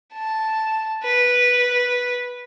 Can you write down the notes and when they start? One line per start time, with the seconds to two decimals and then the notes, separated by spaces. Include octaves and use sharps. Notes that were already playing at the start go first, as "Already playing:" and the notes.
0.13 A5
1.03 B4